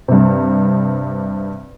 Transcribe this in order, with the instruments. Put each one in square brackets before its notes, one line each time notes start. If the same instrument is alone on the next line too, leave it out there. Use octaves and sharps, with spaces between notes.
[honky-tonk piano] G2 C3